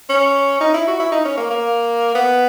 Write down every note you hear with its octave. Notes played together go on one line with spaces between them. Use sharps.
C#4
D#4
E4
F#4
E4
D#4
C#4
A#3
A#3
B3